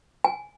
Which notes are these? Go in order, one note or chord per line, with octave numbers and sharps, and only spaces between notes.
G#5